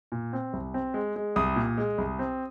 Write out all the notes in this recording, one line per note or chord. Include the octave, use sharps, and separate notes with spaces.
A#2
C4
C2
C4
G#3
G#3
C2 D#6
A#2
G#3
C2
C4